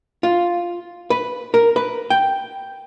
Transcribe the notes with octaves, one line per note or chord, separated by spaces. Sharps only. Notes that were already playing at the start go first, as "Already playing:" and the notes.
F4
B4
A#4
B4
G5